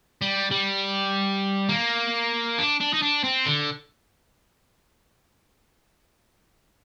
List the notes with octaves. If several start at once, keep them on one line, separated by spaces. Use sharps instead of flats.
G3
G3
A#3
D4
D4
D#4
D4
C4
D3